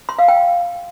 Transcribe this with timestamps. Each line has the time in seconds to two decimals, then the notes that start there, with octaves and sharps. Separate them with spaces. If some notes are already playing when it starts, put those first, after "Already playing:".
0.09 C6
0.19 F5
0.28 G5